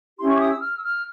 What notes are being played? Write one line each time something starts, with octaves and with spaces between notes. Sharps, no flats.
C#4 E4 G4 C6
C#6
D6
D#6
E6
F6
E6
F6